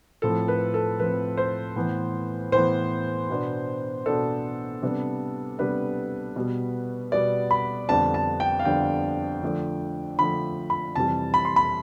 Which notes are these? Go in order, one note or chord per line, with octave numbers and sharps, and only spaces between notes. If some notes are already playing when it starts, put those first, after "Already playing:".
A2 F3 C4 A4
B4
A4
A2 F3 C4 B4
C5
A2 E3 B3
A2 E3 B3 C5
B2 B3 D4
B2 B3 D4 A4
C3 G3 B3 D4
C3 G3 B3 D4 B4
B2 G3 B3
B2 G3 B3 D5
B5
F2 D3 G3 B3 D4 A5
A5
G5
F5
F2 D3 G3 B3 D4 G5
D3 F3 A3 D4
D3 F3 A3 D4 B5
B5
F2 C3 E3 G3 A5
B5
C6
B5